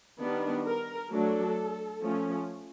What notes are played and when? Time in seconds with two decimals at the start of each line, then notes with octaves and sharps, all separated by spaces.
0.20 D#3 G3 B3 D4
0.66 A#4
1.11 F#3 A3 D4 A4
2.02 F3 A3 C#4